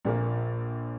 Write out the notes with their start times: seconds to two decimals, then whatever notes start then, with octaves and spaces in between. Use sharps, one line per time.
0.05 A#1 A#2 A#3